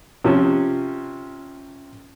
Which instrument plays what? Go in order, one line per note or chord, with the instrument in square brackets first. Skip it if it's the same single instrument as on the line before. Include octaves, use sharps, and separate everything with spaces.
[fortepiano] C3 F3 C#4